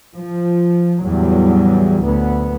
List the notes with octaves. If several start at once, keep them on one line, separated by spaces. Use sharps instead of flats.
F3
E2 A2 F#3 G3
D2 B3